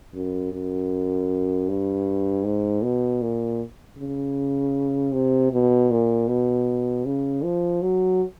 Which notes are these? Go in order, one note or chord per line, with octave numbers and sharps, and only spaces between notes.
F#2
F#2
G2
G#2
B2
A#2
C#3
C3
B2
A#2
B2
C#3
F3
F#3